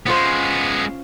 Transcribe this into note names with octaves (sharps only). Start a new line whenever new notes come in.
G#3 B3 C#4 F4 C5